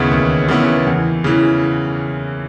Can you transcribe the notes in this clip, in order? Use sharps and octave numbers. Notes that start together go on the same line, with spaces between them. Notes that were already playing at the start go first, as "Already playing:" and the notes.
Already playing: D#2 C#3 E3 B3 E4
D#2
C#3 E3 B3 E4
E2
C#3 E3